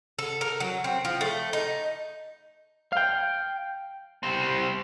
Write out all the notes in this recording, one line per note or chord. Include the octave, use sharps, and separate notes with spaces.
A4
A#4
F#3
C4
F3
A3
D#4
F5 G5
G3 C4